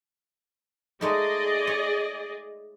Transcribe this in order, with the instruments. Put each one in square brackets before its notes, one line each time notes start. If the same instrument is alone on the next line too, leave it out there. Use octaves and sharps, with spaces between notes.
[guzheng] G#3 A3 D#4 [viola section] G#4 D5 D#5
[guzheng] C#5